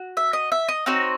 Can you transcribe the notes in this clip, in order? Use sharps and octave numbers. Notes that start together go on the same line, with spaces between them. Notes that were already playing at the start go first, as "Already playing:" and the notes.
Already playing: F#4
E5
D#5
E5
D#5
C4 D#4 F#4 C#5